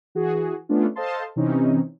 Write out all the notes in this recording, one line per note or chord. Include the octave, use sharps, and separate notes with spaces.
E3 F#4 G#4
A3 B3 C#4 D4 F4
A4 C5 D#5 F5 A5 C6
C3 E3 C4 C#4 D#4